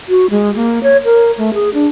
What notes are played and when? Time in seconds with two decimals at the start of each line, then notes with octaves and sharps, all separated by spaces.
0.09 F#4
0.30 G#3
0.55 A#3
0.83 C#5
1.05 A#4
1.38 A3
1.54 G#4
1.74 D4